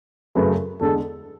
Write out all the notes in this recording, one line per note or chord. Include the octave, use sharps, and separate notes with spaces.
F#2 C#3 F#3 A3 B4
E2 D3 G#3 A4